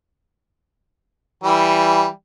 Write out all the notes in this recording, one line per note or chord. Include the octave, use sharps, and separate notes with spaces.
E3 G3